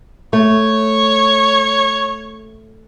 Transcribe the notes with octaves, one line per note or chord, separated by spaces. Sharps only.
A3 C#5